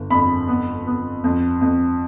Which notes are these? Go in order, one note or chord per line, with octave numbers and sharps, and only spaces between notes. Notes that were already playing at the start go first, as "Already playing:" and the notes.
Already playing: G1
F2 B5
B3
B3
F2
F2